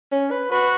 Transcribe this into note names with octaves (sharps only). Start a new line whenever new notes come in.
C#4
B4
F#4 B4